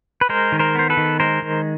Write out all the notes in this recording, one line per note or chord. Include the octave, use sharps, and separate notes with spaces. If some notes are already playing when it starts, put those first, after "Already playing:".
B4
G#3 A#4 C5
D#3
A#4 C5
B3 C5
A4 B4
D#3
G#3 A#4 C5
D#3